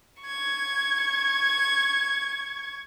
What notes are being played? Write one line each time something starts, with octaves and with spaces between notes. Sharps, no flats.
C#6 G#6